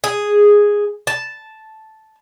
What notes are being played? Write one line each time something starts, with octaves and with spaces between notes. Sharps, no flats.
G#4
A5